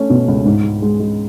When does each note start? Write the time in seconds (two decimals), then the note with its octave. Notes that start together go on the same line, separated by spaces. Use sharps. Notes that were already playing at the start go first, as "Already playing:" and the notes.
Already playing: A3 C#4
0.10 B2
0.28 C#2
0.45 G#2
0.64 G#3
0.82 G#3
1.00 G#3